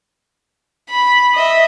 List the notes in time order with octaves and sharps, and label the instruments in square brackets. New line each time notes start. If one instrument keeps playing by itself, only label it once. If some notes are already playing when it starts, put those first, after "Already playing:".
[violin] B5
D#5 E5